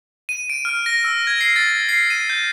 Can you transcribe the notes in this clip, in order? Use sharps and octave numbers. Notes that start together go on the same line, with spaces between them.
D#7
D7
F6
A#6
E6
G#6
C7
A6
C7
D#7
G6